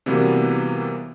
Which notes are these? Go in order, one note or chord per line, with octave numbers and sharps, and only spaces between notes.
C3 E3 G3 A#3 B3 F#4